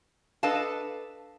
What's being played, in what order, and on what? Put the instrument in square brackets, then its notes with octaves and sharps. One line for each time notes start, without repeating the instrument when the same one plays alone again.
[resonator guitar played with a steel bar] D4 A4 B4 D#5 F5 A5